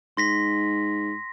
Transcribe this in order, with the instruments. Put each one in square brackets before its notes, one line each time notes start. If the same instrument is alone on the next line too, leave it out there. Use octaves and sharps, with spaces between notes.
[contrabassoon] G#2 [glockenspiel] C6 A#6 B6